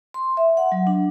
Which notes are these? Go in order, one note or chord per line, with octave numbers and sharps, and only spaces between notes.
C6
E5
F#5
F#3
D4